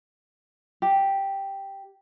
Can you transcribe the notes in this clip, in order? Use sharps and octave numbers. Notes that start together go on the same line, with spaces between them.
G4